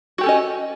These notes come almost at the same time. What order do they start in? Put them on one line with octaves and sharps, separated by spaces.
F#4 G4 A4 C#4 D#5